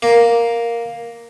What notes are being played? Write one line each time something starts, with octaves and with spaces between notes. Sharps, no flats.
A#3